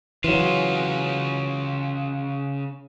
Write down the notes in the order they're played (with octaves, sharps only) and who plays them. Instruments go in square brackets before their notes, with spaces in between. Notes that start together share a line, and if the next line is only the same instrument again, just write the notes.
[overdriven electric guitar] C#3 F4 [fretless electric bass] E3 F#3